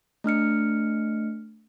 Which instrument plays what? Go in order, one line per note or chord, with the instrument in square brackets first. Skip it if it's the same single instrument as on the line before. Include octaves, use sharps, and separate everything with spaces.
[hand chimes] A3 D4 F6 C#7